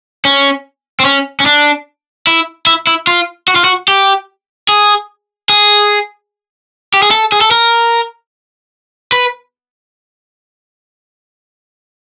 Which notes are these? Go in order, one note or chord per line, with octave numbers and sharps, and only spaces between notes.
C#4
C4
C#4
C#4
D4
E4
E4
E4
F4
F#4
F4
F#4
G4
G#4
G#4
G4
G#4
A4
G#4
A4
A#4
B4